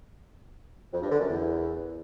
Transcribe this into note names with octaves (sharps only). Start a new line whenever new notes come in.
F2
G2
D3
F#2
E2